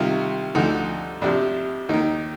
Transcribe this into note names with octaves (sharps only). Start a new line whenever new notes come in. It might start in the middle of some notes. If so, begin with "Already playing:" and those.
Already playing: C2 C3 D#3 F4
D2 D3 F3 D#4
F2 C3 F3 D4
D#2 D#3 D#4